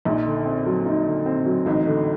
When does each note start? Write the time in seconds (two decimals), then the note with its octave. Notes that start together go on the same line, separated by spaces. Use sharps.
0.05 A#1 A#2 D#4
0.26 D3
0.46 C4
0.66 F#3
0.86 D#4
1.06 D3
1.26 C4
1.46 F#3
1.66 A1 A2 D#4
1.86 D3